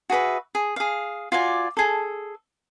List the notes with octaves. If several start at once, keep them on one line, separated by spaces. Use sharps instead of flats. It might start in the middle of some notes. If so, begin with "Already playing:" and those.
F#4 G#4 B4 E5
G#4
G#4 F5
F4 F#4 D5 G#5
G#4 A4